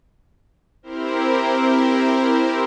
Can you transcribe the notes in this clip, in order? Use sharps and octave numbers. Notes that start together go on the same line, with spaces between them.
C4 E4 G4 A#4 C5